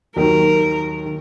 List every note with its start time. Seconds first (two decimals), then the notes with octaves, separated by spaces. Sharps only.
0.16 D#2 D#3 F#3 A#4
1.06 D#3